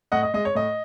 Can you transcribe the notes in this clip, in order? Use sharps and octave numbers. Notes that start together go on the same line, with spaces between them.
A2 D#5 F#5
D#5
G#3 D#5
C#5
A2 D#5